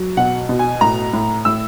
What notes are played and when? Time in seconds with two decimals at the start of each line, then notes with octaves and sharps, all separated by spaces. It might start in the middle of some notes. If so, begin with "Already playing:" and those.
Already playing: F#3
0.17 B2 F#5
0.49 B2
0.59 G#5
0.81 A2 A#5
1.13 A2
1.45 A2 E6